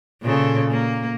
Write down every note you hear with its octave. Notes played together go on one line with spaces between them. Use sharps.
A#2 C#3 A4
A#3